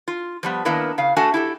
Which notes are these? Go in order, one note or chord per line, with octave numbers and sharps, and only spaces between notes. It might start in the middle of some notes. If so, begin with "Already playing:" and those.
F4
F3 G3 B3
D#3 A#3 B3 D4 E4 A#4
C#3 F5
A3 D4 F#4 F#5 G#5 A5
E4 G4 A4